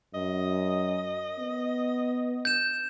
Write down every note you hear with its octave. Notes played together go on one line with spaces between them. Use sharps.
F#2 D#5
B3
G6 E7